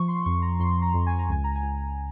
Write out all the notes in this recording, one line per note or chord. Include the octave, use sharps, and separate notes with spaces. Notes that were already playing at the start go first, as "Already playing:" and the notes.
Already playing: F3 C#6
C6
F2 C#6
A#5
F2 C6
A#5
F2
G#5
A#5
C#2 G#5
A#5
G#5
C#2